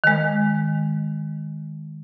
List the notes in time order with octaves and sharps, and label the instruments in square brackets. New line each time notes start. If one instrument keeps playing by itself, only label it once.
[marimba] D#3 G#3